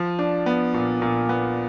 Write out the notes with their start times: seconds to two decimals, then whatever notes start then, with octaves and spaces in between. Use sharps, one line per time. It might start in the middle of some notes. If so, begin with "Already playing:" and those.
Already playing: F3
0.19 D4
0.46 B3
0.74 A#2
1.02 A#2
1.29 B3